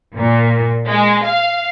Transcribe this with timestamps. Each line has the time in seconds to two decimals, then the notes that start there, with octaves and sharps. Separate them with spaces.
0.16 A#2
0.87 G#3
1.25 F5